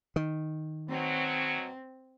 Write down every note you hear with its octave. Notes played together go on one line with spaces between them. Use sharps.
D#3
B2 F#3 C4